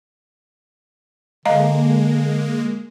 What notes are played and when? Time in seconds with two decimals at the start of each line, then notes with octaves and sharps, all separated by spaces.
1.45 D3 G#3 A#3 D#5 F5 A#5